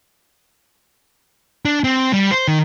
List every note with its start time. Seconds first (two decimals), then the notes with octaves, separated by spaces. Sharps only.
1.65 D4
1.84 C4
2.13 G3
2.31 C5
2.48 D#3